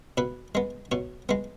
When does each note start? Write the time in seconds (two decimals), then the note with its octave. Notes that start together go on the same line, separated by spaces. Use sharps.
0.18 B2 B4
0.55 G#3 B3
0.92 B2 C#5
1.29 G#3 B3